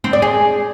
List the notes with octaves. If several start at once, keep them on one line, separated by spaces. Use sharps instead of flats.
C4
D5
G#4